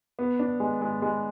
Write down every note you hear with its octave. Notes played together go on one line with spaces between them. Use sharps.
B3
D4
G#3
G#3
G#3